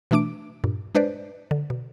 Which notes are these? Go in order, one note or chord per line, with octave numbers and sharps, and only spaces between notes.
B2 E3 A3 D4 D6 D7
G2 A#2
G#3 D4 B4 C5 D5
D3
B2